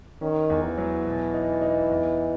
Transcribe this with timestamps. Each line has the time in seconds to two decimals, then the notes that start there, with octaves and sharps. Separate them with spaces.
0.21 D#3 C#4
0.50 E2
0.64 E3
0.77 F#3
1.06 B2
1.34 D#4
1.61 D#4
1.90 E2